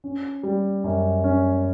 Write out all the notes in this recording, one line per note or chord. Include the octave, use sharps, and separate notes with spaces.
C#4
G3
F#2
C#4